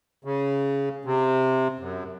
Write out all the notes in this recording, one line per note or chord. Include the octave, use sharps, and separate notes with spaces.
C#3
C3
F#2